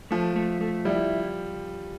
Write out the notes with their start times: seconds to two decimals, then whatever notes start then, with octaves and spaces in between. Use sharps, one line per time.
0.11 F3 A3
0.36 A3
0.61 A3
0.85 G3 E4